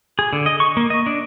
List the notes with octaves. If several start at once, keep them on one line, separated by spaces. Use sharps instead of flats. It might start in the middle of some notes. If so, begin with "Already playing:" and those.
G#4
D3
D#5
C#6
A#3
D#5
D4